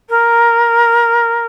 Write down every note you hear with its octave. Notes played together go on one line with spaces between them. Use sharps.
A#4